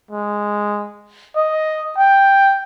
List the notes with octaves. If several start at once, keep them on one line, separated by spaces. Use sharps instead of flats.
G#3
D#5
G5